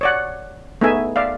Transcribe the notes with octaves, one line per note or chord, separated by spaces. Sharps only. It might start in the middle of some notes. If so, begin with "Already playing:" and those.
C#5 D5 F#5
A3 B3 D#4 G#4 E5 G#5
D5 E5 F5